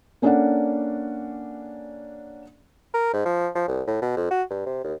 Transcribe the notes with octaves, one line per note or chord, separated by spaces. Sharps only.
A#3 C#4 D4 A4 D5 F#5
A#4
G#2
F3
F3
C2
A2
B2
F2
F#4
G2
C3
D#2